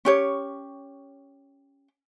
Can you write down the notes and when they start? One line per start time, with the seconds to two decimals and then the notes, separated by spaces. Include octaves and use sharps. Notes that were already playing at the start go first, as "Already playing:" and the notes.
0.05 C#4 G4 C#5